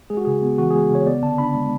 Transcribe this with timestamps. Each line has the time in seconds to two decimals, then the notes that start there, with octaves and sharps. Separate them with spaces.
0.10 G#3 G#4
0.17 F#4
0.25 C#3 G#4
0.42 B3
0.58 E3 F#4
0.70 G#4
0.75 G#3
0.91 C#3 C#5
1.06 B3 D5
1.23 D3 A5
1.38 D4 B5
1.55 G#3